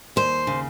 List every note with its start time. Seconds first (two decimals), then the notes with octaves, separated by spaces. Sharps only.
0.16 D#2 C5
0.47 C#3